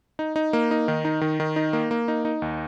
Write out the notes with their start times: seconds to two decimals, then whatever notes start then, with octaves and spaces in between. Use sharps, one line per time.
0.19 D#4
0.36 D#4
0.53 A#3
0.71 D#4
0.88 D#3
1.05 D#4
1.21 D#3
1.40 D#3
1.56 D#4
1.73 A#3
1.91 A#3
2.08 D#4
2.25 D#4
2.42 D#2